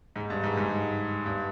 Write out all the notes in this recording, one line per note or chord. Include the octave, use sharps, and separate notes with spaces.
G#2
G2
G#2
G#2
G2